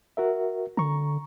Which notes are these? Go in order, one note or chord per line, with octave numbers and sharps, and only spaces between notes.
F#4 A#4 E5
D3 A#5 C#6